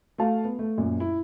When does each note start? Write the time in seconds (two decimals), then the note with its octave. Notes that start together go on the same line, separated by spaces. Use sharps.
0.18 A3 F#4 F5 A5
0.45 B3
0.59 A3
0.78 F#2 A#2
1.00 E4